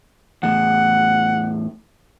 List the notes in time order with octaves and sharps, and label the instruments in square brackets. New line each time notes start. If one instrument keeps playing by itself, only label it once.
[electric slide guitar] E2 A2 [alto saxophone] F#5